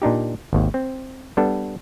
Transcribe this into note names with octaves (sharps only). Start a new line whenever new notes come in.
A#2 D4 D#4 G4
G#1 D#2
C4
G3 B3 D4 A4